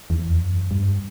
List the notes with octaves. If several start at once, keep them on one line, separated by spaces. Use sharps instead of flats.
E2
F2
F#2
G2